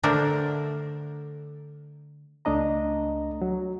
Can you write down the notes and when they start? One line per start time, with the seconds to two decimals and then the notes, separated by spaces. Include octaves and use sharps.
0.03 D3 A3 D4 A#4 C5
2.45 C#2 A3 D4 D#5 A#5
3.42 F#3